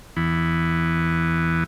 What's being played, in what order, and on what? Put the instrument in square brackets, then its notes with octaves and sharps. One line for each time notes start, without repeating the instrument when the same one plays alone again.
[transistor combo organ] E2 E3 B3